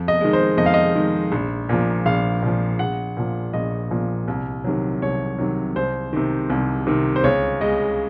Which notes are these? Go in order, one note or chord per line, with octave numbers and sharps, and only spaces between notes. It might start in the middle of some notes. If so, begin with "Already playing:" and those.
Already playing: F2
D#5
D#3 G#3
C5
F2 D#5
F5
D#5
D#3 G#3
A#1
A#2 F3
A#1 F5
A#2 F3
A#1 F#5
A#2 F3
A#1 D#5
A#2 F3
C2
C3 D#3 F#3
C2 C#5
C3 D#3 F#3
C2 C5
C3 D#3
C2
C3 D#3
C5
C#2 C#5
C#3 G#3 D#5